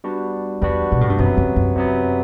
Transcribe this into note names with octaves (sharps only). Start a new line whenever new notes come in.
G3 B3 D4 F#4
E2 G3 B3 D4 F#4
B2
A2
G2
F#2 C3 F#3 B3
F#2
F#2
C3 F#3 B3